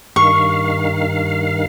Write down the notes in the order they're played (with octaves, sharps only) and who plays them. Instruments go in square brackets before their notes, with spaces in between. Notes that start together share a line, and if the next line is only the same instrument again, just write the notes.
[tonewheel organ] G2 D#3 F5 [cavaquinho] C#6